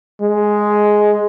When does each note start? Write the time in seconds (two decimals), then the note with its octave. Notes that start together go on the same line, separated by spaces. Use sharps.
0.21 G#3